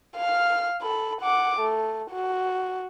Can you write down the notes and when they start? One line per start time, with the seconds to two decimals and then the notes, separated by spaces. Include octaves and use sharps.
0.17 F5 F6
0.82 A4 B5
1.21 F#5 D6
1.60 A3
2.11 F#4